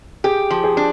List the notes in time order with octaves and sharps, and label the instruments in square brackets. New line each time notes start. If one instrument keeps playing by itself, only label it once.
[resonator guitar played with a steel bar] G4 [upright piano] G#4
[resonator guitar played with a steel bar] F3
[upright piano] G#4
[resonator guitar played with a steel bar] D4